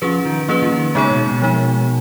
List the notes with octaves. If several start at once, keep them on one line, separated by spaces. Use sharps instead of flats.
F3 C#4 G#4 B4
D#3
F3 A#3 C#4 G#4 B4
F3
D#3
C#3 G#3 B3 D#4 G#4 C#5
B2
B2
F3 G#3 D#4